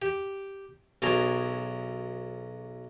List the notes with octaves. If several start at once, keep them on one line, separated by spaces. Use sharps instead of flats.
G4
B1 F#3 D4 G#4 A#5